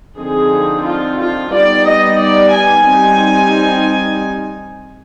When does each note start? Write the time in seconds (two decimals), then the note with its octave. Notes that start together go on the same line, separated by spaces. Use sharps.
0.18 D3 F3 C4 D#4 G#4
0.86 F4
1.20 F4
1.54 G3 B3 D#4 D5
1.88 D#5
2.22 D5
2.56 G#5
2.90 G3 C4 D#4